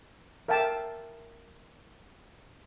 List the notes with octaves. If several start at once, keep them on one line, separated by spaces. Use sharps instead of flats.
A#4 E5 F5 G5 A5